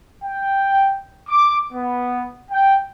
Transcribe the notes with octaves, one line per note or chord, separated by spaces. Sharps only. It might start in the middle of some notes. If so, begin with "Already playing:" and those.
G5
D6
B3
G5